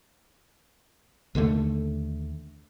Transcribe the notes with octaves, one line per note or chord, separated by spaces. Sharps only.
D#2 D3 F3 A3